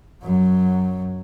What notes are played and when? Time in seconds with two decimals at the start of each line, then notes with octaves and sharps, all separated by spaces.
0.22 F#2 F#3